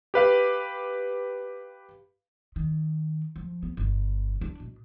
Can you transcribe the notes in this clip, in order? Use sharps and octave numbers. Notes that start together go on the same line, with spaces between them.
G4 B4 F5
D#3
F3
B3
G1 B2
D4
B2